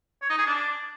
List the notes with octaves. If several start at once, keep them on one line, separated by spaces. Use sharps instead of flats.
C#5
D#4
G#4
D4